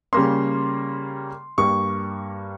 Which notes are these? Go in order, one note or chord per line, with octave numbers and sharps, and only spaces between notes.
C#3 G3 A#3 C#4 C6
G2 G3 A#3 C#6